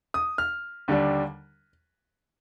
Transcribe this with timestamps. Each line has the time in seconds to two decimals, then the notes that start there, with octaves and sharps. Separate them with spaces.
0.14 D#6
0.38 F6
0.88 D#2 D3 G3 D4